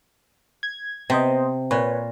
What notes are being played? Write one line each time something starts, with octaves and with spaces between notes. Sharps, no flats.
G#6
C3 B3 C5 D#5
A#2 B4 C#5